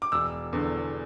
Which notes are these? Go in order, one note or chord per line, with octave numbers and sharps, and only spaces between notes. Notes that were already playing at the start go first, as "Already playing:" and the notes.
D6
E1 E6
E2 D3